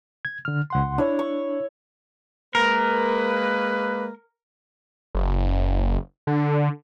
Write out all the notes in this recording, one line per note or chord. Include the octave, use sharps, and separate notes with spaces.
G#6
D3 F6
C#2 F#5 C6
D4 E4 C#5
C#6
G#3 A#3 A#4 B4
F#1
D3